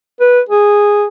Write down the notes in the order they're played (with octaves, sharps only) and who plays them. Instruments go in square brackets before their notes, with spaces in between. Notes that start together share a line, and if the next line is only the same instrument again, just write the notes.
[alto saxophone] B4
G#4